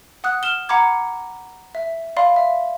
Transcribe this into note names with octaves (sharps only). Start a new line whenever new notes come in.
F#5 D#6 F#6
F6 E7 G7
F#5 A#5 B5 D6 G#6
E5
D5 F5 B5 C6
E5